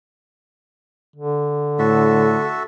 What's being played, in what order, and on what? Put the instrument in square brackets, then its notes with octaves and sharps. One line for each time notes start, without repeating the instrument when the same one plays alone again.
[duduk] D3
[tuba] A2 [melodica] F#4 A4 E5